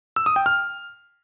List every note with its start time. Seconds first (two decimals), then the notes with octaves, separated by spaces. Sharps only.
0.16 E6
0.26 D#6
0.36 G5
0.46 F6